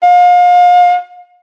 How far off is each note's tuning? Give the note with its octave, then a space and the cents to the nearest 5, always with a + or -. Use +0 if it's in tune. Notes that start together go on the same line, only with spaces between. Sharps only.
F5 +35